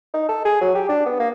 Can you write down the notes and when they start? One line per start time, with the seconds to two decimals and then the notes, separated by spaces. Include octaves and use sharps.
0.14 D#4
0.29 A4
0.45 G#4
0.61 F#3
0.75 G4
0.89 D4
1.06 B3
1.20 A#3